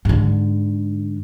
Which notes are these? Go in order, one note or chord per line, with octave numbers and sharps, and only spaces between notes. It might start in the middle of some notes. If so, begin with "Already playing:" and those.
G#2 D3